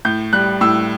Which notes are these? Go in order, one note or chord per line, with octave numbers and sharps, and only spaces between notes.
A2 G6
G3 F#6
A2 E6